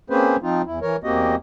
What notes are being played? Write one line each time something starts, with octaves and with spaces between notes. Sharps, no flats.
A#3 C4 C#4 G#4 B4 C5
F3 C4 D#4 F4
E2 E4
E3 A#4 C#5
E2 A#3 C4 F#4 G4 D#5